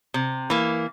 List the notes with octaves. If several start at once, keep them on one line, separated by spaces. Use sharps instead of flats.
C3
E3 A#3